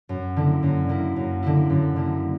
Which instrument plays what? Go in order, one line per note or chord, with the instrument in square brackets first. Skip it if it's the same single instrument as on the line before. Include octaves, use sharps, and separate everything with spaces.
[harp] F#2
D3 A#3 E4
F#2
D3 A#3 E4
F#2
D3 A#3 E4
F#2
D3 A#3 E4